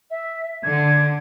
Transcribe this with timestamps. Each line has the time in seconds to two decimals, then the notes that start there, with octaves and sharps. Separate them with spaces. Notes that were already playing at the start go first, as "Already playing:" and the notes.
0.10 E5
0.63 D3 G#6